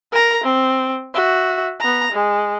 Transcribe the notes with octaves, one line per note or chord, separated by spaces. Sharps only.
A#4 A#5
C4
F#4 E5
B3 A#5
G#3